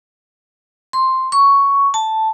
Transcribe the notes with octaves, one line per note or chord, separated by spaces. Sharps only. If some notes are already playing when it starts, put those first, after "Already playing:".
C6
C#6
A5